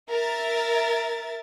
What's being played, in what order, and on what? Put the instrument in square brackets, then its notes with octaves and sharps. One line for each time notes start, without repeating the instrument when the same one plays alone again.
[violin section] A#4 E5 A6